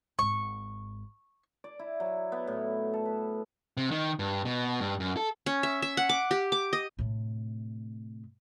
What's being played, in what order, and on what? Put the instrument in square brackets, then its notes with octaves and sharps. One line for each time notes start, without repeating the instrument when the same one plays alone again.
[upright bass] G#1 G#2 [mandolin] C#6
[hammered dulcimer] D5
E4
F#3
B3
A2
A4
B4
[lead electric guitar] C3
D#3
G2
B2
G2
F#2
A4
[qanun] C#4
E5
E5
F#5
D6
G4
D6
D#5
[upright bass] A2 C3